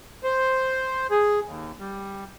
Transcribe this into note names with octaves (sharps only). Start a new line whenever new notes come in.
C5
G#4
D#2
G3